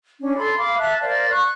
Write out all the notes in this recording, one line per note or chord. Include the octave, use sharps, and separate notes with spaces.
C#4 D4
A4 B5 C6
F5 B5 D6
E5 A5 F#6
A#4 C5 D5 F5
C#6 F#6